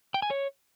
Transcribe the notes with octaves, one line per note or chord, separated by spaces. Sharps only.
G5
G#5
C#5